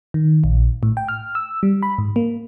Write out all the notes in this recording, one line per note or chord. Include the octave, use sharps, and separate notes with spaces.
D#3
A#1
A2
G5
F6
E6
G3
B5
G#2
A#3